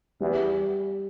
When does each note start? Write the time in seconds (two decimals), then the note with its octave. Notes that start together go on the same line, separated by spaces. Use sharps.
0.20 E2 G3